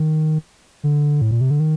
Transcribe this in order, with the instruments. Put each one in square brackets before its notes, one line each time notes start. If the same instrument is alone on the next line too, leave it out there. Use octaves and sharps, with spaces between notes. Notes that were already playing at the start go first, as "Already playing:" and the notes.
Already playing: [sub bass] D#3
D3
A2
A#2
C3
D3
D#3